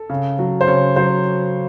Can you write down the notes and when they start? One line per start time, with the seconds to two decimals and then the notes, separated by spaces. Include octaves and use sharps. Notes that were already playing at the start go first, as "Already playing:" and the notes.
Already playing: A4
0.10 C#3
0.39 F#3
0.61 C5
0.67 C#3 C#5
0.96 F#3 C5